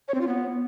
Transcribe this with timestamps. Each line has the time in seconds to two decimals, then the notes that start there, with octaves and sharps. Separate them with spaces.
0.08 C#5
0.15 C4
0.21 F4
0.27 B3